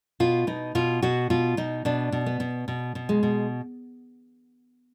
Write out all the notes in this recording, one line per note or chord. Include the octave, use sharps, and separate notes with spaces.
B2 F4
B2 D#4
B2 F4
B2 F#4
B2 F4
B2 D#4
B2 D4
B2
B3
B2
B2
B2
G#3
B2